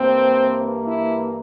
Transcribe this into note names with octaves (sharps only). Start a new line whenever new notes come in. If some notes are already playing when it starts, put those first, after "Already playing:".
Already playing: G2 E3 A#3 C4
E4